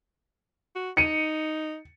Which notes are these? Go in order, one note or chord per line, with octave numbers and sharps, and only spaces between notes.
F#4
D#4 C#7 D#7